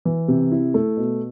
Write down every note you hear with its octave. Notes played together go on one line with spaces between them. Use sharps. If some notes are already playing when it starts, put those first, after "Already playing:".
E3
C3
E4
A3
B2